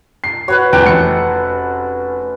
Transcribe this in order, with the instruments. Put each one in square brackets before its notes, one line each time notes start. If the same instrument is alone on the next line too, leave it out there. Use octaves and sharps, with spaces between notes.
[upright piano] C7
[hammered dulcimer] F#4 B4 F#5 [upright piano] C#5
[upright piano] E2 G5 [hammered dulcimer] C#4 F#5
[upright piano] F1 C#7